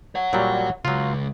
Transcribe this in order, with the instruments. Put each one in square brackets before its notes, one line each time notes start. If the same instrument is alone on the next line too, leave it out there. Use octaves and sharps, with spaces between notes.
[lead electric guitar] C#5 F#5
[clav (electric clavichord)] A#2 F#3 G3
[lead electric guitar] C#2 [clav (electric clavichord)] F#3 F4